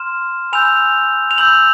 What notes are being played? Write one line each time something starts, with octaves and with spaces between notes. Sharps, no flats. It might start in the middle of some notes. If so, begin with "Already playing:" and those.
Already playing: C6 F6 E7
G#5 B5 E6 G6 F7
F7
B5 E6 G6 F#7